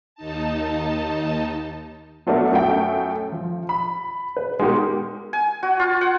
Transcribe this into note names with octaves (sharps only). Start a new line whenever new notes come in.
D#2 D#4 A5
F#3 A3 B3 D4 A#4
F#2 F#3 A3 G5
F3
B5
B4
G#3 B3 D#4 F#4 G4 A#4
G#5
F#4
F4
F#5